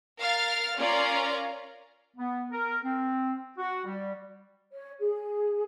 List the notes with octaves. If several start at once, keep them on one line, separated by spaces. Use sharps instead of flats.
A#4 F5 F6 A6
C#4 F4 A#4 D5 F5 A#5
B3
A#4
C4
F#4
G3
C#5
G#4